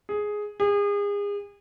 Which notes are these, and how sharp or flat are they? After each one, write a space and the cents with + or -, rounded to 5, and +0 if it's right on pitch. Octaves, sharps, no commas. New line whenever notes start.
G#4 +5
G#4 -35